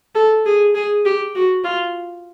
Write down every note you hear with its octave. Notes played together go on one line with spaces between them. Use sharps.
A4
G#4
G#4
G4
F#4
F4